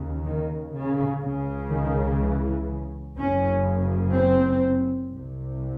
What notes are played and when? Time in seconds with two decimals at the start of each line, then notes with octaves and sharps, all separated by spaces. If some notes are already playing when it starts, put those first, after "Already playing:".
Already playing: D#2 C#3
0.25 D#3
0.74 C#3
1.22 C#2 C#3
1.71 D#3
2.19 E3
3.17 F#1 F#2 C#3 C#4
4.14 C4
5.11 C2 C3